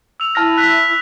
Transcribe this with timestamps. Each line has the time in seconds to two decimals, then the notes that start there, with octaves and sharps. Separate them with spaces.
0.20 E6 F7
0.35 E4 A5 F6 A#6
0.57 F#6 B6